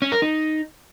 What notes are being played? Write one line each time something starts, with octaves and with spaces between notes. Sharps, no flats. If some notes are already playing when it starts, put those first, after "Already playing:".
C#4
A#4
D#4